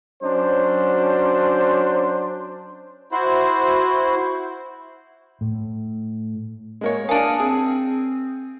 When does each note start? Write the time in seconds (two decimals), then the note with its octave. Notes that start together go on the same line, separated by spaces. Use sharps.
0.22 F#3 C#4 D4 C5
3.12 E4 F#4 C5
5.41 A2
6.81 G#3 A#3 C#5
7.09 A#3 D4 F5 G#5 A5 D#6
7.40 C4 G#4